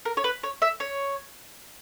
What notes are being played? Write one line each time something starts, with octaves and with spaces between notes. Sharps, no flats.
A#4
C#5
B4
C#5
E5
C#5